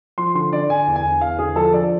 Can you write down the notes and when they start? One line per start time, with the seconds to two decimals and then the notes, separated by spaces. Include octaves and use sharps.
0.18 F3 C6
0.35 D3 C6
0.53 D3 D5
0.70 D3 G#5
0.87 E2
0.96 G#5
1.04 E2
1.21 E2 F5
1.39 D3 G#4
1.56 F3 A4
1.73 F3 D5